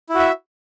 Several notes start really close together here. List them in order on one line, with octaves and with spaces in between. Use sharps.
E4 F#4 E5